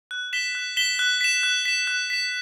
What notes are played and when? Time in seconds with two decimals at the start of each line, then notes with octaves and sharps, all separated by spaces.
0.11 F#6
0.33 B6 E7 G7
0.55 F#6
0.77 B6 E7 G7
0.99 F#6
1.21 B6 E7
1.43 F#6
1.65 B6 E7
1.87 F#6
2.10 B6 E7